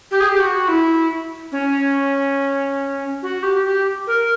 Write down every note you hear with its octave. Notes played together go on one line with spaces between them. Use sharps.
G4
G#4
G4
F#4
E4
C#4
F#4
G4
G4
A#4